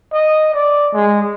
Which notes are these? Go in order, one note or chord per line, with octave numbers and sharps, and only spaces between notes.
D#5
D5
G#3